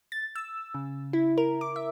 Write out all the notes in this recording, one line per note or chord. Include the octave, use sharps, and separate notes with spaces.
A6
E6
C#3
E4
A#4
D6
E5